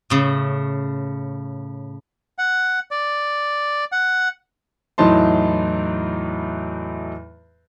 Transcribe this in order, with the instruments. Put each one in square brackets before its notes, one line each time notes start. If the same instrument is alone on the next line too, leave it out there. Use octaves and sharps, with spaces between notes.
[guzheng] A2 C#3
[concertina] F#5
D5
F#5
[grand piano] E2 A2 F#3 D#4 A5 C6